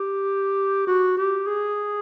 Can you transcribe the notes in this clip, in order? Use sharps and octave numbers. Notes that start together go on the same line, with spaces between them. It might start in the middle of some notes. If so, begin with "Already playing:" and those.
Already playing: G4
F#4
G4
G#4